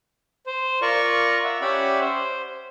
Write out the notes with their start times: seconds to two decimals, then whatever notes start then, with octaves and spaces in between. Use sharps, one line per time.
0.46 C5
0.82 F4 A#4 D5 C#6
1.44 E5 F#5
1.61 C#4 G4 D5 E5 F#5 B5
2.00 C5